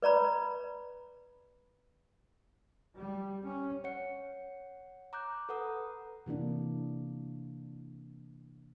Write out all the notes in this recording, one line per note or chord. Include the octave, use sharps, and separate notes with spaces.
B4 D5 A#5 B5
G3
C#4
C#5 F#5 C#7
A#5 D6 F#6 G6
A4 B4 F#5 A#5 D#6
C3 E3 A#3 D4